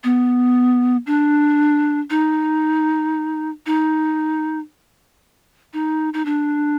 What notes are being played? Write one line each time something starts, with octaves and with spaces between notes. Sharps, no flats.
B3
D4
D#4
D#4
D#4
D#4
D4